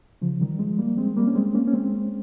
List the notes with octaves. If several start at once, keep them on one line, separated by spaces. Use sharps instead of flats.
C#3 F3
D#3 G3
F3 G#3
G3 A#3
G#3 C4
G3 A#3
C#4
G#3 C4
A#3 C#4
C#4
G#3 C4